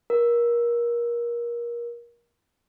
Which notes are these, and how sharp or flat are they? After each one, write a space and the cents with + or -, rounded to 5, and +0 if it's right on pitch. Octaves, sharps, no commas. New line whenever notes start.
A#4 +25